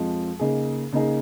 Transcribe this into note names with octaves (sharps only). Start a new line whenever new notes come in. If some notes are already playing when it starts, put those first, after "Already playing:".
Already playing: F2 F3 G#3
C#3 A#3 D#4 G#4
C#3 A#3 D#4 G#4